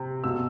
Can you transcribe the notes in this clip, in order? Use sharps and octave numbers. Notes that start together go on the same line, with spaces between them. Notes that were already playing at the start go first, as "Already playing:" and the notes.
Already playing: C3
B2 E6